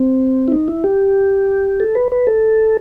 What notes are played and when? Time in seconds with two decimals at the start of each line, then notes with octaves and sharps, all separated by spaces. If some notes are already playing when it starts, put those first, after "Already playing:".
Already playing: C4
0.48 E4
0.52 D#4
0.68 E4
0.84 G4
1.80 A4
1.95 B4
2.12 B4
2.27 A4